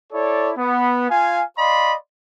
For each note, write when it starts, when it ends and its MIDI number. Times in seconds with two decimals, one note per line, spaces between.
0.13 0.51 64
0.13 0.51 69
0.13 0.51 73
0.13 0.51 74
0.58 1.08 59
1.09 1.43 65
1.09 1.43 77
1.09 1.43 80
1.58 1.95 74
1.58 1.95 75
1.58 1.95 77
1.58 1.95 83
1.58 1.95 84